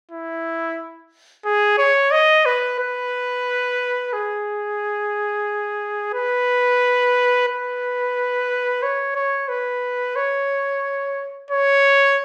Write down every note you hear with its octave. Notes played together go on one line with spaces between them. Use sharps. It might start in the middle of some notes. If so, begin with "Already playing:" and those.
E4
G#4
C#5
D#5
B4
B4
G#4
B4
B4
C#5
C#5
B4
C#5
C#5